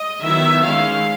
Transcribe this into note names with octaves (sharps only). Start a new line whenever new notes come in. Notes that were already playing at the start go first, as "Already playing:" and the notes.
Already playing: D#5
D#3 F#3 B3 E4 E5
D#3 G#3 C#4 E4 F5